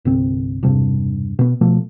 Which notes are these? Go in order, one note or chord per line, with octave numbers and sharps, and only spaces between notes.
G1 C2 C4
E1 G2 C3
B2 B3
B2 F3 A3